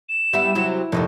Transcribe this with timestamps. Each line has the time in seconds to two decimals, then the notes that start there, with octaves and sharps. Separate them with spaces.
0.09 E7
0.33 G3 B3 E4 E5 B5
0.55 C3 F#3 E4
0.92 F1 A#2 D#3 A3